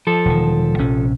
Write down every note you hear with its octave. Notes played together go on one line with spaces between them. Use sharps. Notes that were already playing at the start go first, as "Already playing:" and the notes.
F3 A4
E1 D#3
A#1 C3 C#4